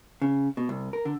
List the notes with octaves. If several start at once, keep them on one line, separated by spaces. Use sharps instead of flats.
C#3
B2
C2
A#4
D3